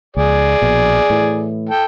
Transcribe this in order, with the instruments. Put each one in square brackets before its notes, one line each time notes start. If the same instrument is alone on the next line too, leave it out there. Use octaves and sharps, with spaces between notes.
[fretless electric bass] C#2 [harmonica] G#4 D5
[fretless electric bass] A#1 B2
A2 E3
[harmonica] A4 G5